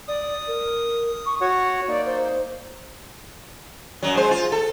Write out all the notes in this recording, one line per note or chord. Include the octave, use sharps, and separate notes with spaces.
D5 D#6
A#4
C#6
F#4 C#5 F#5 C#6
A#3 D#4 D5
C5
F#2 F#3
G#3 C5
F4
A4